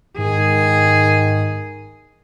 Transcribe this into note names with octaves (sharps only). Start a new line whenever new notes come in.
G#2 D#3 G#4